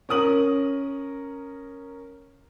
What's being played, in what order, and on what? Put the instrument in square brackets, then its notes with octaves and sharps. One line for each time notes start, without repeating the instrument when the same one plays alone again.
[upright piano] C#4 A#4 D#6 F#7